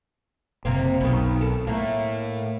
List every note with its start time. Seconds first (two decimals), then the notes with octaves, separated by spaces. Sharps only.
0.65 F#1 C3 A#3 C4
1.01 B1 B2 D#3
1.41 A4
1.67 A2 A3 A#3